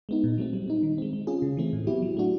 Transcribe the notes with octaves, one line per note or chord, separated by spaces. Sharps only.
G#3 B3 D#4
A#2
F#3 A3 C4
G3
C4 D#4
D#3
G#3 C4
G#3
C#4 F4 G#4
C#3
E3 A3 C4
A2
F#3 B3 E4 G4
F#3
A3 D4 F#4